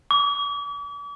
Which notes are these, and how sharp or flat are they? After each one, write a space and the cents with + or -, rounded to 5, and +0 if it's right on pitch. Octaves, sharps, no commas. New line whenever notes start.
D6 -40